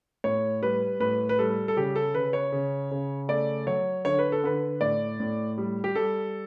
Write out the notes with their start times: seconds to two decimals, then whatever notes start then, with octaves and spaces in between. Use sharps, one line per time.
0.24 A2 C#5
0.62 G3 B4
1.00 A2 B4
1.29 B4
1.39 G3 A4
1.68 A4
1.76 C#3 G4
1.96 A4
2.15 C#3 B4
2.33 C#5
2.52 C#3
2.91 C#3
3.28 A3 D5
3.67 F#3 C#5
4.05 D3 C#5
4.19 B4
4.32 A4
4.44 D3 B4
4.81 A2 D5
5.20 A2
5.58 G3
5.84 G4
5.95 G3 A4